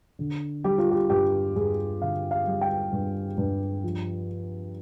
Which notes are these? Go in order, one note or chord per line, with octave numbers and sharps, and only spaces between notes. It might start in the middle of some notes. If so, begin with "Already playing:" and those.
D3
G3 G4
F4
G4
G2 G4
G2 G#4
D3 F5
F5
G3
G5
G2
G2
F3